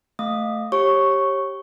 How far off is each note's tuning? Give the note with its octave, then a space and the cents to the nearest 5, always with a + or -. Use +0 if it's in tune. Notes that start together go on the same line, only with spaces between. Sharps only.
A3 +0 F5 +10 D#6 +0
G4 +0 C#5 -30 C#6 +0